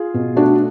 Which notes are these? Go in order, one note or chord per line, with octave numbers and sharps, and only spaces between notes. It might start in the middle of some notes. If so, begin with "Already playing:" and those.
Already playing: F4 G#4
B2
A3 D4 F#4